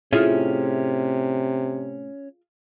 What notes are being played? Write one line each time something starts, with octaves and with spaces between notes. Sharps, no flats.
A2 C3 A3 C#4 E4 F4 G#4